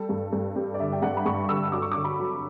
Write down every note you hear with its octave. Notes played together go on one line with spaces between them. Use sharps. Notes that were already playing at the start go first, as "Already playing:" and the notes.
Already playing: G3 A4
G2
G2
G3
D5
D3 E5
G5
G2 F#5
B5
G2 C#6
D3 E6
F#3 D6
C#6
D6
D3
B5
F#3